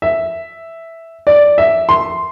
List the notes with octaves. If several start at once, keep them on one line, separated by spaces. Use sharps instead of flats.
E5
D5
E5
C6